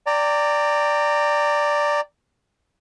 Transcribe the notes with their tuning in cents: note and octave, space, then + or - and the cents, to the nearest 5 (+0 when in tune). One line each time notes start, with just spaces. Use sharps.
D5 +0 G5 +10 A#5 -25